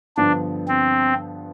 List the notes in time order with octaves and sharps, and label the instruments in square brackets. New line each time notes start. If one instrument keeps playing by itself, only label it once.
[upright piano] G2 D3 F3 B3 [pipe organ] D4
[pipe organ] C4